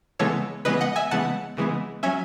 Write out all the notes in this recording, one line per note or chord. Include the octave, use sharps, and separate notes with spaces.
C#3 E3 G#3 B3 A4 C#5
C#3 E3 G#3 B3 B4 D#5
D#5 F#5
E5 G#5
C#3 E3 G#3 B3 F#5 A5
C#3 E3 G#3 B3
F#3 C#4 E5 G#5